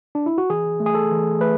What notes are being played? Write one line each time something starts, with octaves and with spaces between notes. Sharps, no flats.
D4
E4
F#4
E3 G#4
A3
G#4
A4
E3
A3 B4